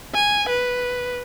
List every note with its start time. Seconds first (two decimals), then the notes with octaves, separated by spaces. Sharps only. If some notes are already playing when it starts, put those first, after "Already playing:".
0.15 G#5
0.49 B4